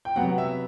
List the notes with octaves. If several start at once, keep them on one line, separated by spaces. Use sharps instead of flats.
G5
C3 F#3 B3 F#5
E5